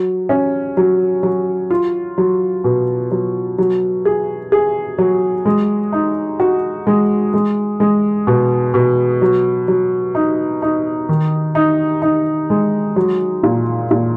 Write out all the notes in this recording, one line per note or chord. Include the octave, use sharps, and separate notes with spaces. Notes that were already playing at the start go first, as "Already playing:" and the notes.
Already playing: F#3
C#4
F#3
F#3
F4
F#3
B2
F#3
F#3
G#4
G#4
F#3
G#3
D#4
F#4
G#3
G#3
G#3
B2
B2
F#3
F#3
D#4
D#4
D#3
D#4
D#4
G#3
F#3
A#2
A#2